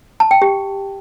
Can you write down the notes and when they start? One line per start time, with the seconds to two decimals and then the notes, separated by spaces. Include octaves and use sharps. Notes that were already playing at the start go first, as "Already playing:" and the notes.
0.20 A5
0.31 G5
0.42 G4